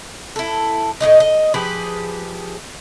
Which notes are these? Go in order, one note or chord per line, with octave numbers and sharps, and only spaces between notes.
E4 A4
A2 C4 D#4 D#5
D#5
F3 G4 G#4 B4